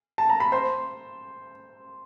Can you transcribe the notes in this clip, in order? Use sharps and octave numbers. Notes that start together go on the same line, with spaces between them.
A5
A#5
B5
C5 C6